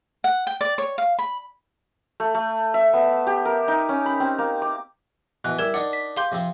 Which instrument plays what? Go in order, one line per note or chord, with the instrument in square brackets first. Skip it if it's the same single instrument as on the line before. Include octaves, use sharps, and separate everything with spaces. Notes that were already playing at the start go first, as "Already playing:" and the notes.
[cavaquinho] F#5
G5
D5
C#5
F5
B5
[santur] A3
A3
E5
B3
G4
A#4
D#4
C#4
B5
C4
A#3
D6
[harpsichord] B2 E3 [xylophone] F#6
[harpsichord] G3 E4 [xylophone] A#4 G#6 E7
[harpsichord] D4 D#4 [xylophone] D5 F#5
[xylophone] B6
[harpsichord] G4 [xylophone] F5 C6 G6
[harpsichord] C3 F3 C4